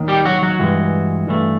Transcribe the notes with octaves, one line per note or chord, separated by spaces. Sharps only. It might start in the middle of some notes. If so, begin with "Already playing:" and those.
Already playing: D#2 D#3
G3 G4
F#3 F#4
F#3 F#4
G2 E3 G#3
G2 E3 A3